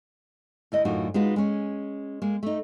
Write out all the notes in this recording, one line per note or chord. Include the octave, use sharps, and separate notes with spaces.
D2 E4 D#5
F#2 A2 D3 D#4 F4 F#4
G#3 D#4 F4 F#4 B4
G#3 C#4
G#3 A#3
A3 D#4